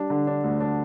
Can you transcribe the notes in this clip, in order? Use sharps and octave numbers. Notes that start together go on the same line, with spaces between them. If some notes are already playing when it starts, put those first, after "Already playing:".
Already playing: G3 D4
D3
D4
D2
D4